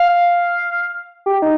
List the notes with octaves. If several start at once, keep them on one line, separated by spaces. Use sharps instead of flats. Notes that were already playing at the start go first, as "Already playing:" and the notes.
Already playing: F5
G4
D#4